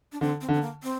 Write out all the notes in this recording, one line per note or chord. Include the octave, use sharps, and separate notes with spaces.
D4
D3 C4
C4
D3
C4
A#3
C4